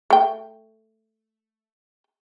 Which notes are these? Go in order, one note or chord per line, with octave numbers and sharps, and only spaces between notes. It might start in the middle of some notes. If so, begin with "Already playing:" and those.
A3 G5